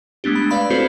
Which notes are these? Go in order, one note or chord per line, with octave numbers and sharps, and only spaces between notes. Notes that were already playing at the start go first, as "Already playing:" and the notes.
G#3 A3 B3 D4 G4
B5
B4 D5 F5 B5
C4 C#4 E4 F#4 A4 C5